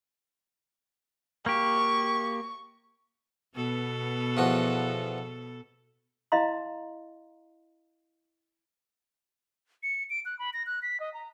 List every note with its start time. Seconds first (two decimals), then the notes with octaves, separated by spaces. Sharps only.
1.46 A#3 G4 C#6
3.55 B2 B3 A4
4.37 E2 F3 F#4
6.32 E4 D#5 F5 A#5 C6
9.83 C#7
10.10 D7
10.25 F#6
10.39 B5
10.53 A#6
10.66 F#6
10.82 B6
11.00 D#5
11.14 A#5